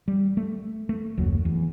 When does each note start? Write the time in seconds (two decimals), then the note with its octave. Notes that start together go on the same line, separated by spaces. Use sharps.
0.08 G3
0.37 A3
0.89 A3
1.18 F#1 D#2 F#3
1.45 E2